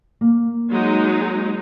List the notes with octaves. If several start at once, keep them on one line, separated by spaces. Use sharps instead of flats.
A#3
F#3 G#3 D#4